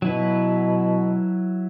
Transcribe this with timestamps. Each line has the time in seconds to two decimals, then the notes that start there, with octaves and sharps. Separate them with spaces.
0.02 B2 F#3 E4 B4